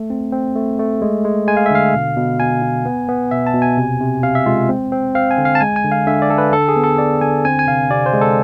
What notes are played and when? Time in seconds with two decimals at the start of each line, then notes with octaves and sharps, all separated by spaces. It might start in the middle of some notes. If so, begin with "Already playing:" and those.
Already playing: A3
0.10 C4
0.32 C4
0.56 A3
0.79 A3
1.02 G#3
1.25 G#3
1.48 G#3 G#5
1.57 F5
1.66 E5
1.71 D3 F5
1.94 B2
2.16 B2
2.40 B2 G#5
2.62 B2
2.85 B3
3.08 B3
3.31 B2 E5
3.47 A5
3.54 B2
3.62 G#5
3.77 C3
4.00 C3
4.23 C3 F5
4.35 E5
4.46 G#3 F4
4.69 C4
4.92 C4
5.15 C4 F5
5.31 G#5
5.38 D3
5.45 F5
5.55 A5
5.60 G#3 G#5
5.76 G#5
5.84 D3
5.92 F5
6.07 D3 E5
6.22 D5
6.30 D3 A4
6.38 B4
6.53 D3 A4
6.68 G#4
6.76 B3
6.84 A4
6.98 B3 D5
7.21 D3 G#5
7.45 C4 G#5
7.59 G#5
7.67 C3 F5
7.90 C3 D5
8.06 C5
8.14 G#3
8.21 A4